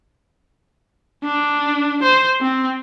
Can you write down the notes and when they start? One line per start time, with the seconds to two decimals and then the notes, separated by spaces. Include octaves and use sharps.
1.24 D4
2.03 C5
2.41 C4